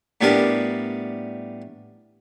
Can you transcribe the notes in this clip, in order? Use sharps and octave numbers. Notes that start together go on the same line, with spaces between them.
A2 G3 B3 D4 A#4